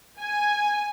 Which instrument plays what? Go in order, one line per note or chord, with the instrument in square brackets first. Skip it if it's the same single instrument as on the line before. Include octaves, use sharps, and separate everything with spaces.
[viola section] G#5